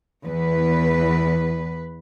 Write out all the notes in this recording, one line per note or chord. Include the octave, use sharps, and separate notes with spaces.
E2 B4